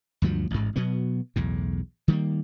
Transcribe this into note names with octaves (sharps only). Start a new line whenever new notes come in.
D2 G2 F3 F#3
A1 G#2
B2 F#3 B3
B1 E2 A2
D#3 G3 G#3 A#3